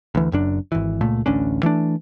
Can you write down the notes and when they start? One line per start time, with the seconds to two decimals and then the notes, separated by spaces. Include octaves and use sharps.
0.15 D2 E3
0.32 F#1 F#2 D4
0.72 G#1 E3
1.01 C#2 A#2 A3
1.26 A1 D2 C#4 D4
1.63 E3 A3 D4